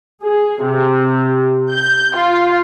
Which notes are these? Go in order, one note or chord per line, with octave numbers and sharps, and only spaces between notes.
G#4
C3
G6
F4